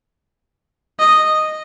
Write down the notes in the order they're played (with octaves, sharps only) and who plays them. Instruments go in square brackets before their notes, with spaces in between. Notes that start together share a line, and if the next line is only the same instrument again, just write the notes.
[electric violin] D#5